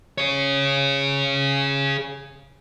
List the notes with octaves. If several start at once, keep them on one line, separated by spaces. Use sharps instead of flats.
G#4 C#5